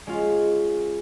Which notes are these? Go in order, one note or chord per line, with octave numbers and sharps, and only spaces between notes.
G#3 C#4 F4